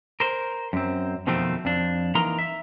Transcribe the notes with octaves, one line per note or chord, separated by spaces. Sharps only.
A#4 C5
F#2 C4
F2 B2 D#3 F3 A3 C4
F2 D4
E3 A#3 D#4 A#4 A#5 C6
E5